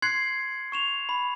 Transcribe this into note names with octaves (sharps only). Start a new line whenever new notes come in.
C6 F#6 G#6 C7 C#7 F#7
C#6 E7 F7
B5